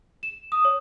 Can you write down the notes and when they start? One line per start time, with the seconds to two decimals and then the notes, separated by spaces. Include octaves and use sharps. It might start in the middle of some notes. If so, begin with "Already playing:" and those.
0.23 E7
0.52 D#6
0.65 C#5